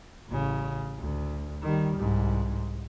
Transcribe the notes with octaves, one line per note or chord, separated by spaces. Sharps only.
A1 C#3
D2
D#3 G3
C2 G#2